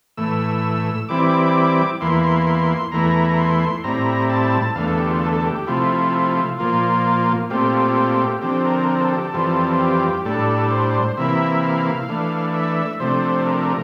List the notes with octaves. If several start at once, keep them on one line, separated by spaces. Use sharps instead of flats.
A2 E3 A3 E6
E3 G3 C4 E4 D6
E2 E3 A#3 E4 C6
C6
C6
E2 E3 A3 E4 A#5
A#5
C6
A2 G3 C4 E4 A#5
A5
E2 D3 A3 F5
A4
G4
F4
A4
A4
G4
G4
C3 F3 A3 E4 F4
A#2 F3 A#3 F4
A#2 A3 C4 F4 G4
D3 F3 C4 G4
A#4
A#4
A4
G4
A4
F2 E3 G3 C4 F4
G4
A2 G3 D4 A4
C5
C3 E3 A#3 E4 E5
F5
E3 A3 D4
E5
C3 F3 A3 D4 C5
A#4